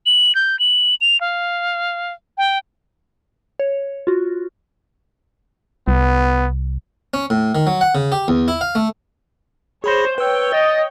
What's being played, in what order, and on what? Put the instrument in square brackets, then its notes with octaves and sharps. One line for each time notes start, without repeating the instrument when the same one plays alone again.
[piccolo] F#7
G6
F#7
F7
F5
G5
[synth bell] C#5
F4 F#4
[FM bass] C2 [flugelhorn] B3
[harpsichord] C#4
A2
D#3
F#3
F#5
C#3
G4
E2
E4
F5
A3
[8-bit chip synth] G#4 B5 A#6 [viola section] C5 C#5
[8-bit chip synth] B4 E6 [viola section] C#5 G5
[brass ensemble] D#5 [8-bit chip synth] A6